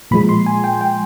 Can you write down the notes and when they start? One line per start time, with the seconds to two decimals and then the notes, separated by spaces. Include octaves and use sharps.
0.11 A#2 F3 G#3 B5
0.29 C6
0.46 G#5
0.64 G5
0.81 G5